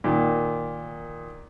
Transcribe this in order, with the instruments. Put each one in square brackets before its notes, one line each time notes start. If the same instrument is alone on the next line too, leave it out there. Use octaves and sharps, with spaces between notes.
[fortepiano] A#2 D#3